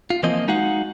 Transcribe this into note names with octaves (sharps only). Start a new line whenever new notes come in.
F4
E3 F3 A#3 C4 D#5
G#3 D#4 F#4 F5 F#5